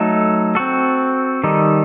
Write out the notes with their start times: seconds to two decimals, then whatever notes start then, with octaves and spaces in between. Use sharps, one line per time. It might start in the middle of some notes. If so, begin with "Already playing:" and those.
Already playing: F#3 A3 D#4 A4
0.55 C4 F#4 A4
1.44 D#3 G3 D#4 A4